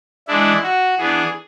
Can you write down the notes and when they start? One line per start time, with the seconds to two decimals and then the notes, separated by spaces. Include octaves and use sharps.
0.28 E3 G#3 D4 E4
0.63 F#4
0.98 E3 B3 D4 G#4